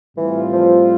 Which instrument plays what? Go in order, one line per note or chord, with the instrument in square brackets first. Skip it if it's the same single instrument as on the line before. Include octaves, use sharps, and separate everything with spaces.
[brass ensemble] A2 G3 C4 F4 [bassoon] E3
[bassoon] F3